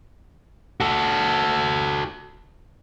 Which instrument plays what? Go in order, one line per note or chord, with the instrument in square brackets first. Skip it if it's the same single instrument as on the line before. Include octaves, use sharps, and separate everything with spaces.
[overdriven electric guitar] F#4 A4